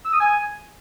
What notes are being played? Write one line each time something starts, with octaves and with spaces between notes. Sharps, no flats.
E6
D#6
G#5